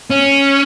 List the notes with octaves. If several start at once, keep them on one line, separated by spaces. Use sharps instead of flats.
C#4